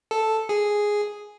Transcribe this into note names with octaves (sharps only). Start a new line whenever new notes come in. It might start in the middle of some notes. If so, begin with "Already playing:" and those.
A4
G#4